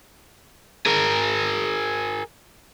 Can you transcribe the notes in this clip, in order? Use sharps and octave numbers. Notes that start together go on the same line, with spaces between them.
G#4 A#4